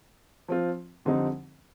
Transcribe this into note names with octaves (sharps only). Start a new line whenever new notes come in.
F3 C4 F4
F2 D3 G3 C4 D#4